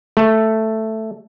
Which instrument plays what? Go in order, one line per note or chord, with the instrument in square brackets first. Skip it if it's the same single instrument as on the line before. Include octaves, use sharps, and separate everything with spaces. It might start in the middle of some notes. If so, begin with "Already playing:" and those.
[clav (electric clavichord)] A3